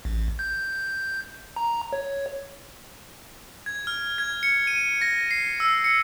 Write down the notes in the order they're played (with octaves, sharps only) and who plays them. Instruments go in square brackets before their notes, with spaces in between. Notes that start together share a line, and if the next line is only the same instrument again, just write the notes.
[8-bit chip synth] A1
G6
A#5
C#5
[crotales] G#6
F6
G#6
C#7
D#7
A#6
C7
E6
C#7